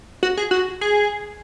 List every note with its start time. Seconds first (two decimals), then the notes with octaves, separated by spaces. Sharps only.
0.23 F#4
0.37 G#4
0.51 F#4
0.81 G#4